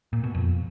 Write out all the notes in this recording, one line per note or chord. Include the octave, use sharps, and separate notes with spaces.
A#2
B2
F2